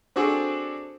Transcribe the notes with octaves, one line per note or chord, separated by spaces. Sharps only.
C4 D4 F#4 G#4 A4